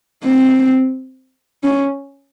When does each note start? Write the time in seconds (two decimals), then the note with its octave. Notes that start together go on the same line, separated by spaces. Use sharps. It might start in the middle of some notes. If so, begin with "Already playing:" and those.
0.24 C4
1.63 C#4